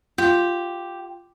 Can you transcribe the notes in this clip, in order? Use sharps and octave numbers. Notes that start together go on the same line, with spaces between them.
F4 G4